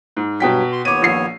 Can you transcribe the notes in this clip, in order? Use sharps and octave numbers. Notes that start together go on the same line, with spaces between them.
G#2
G2 B2 F#3 G5 B6
C6
D#2 B3 C#5 D6 D#7
A#1 C7